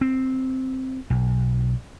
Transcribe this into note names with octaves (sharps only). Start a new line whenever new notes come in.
C4
B1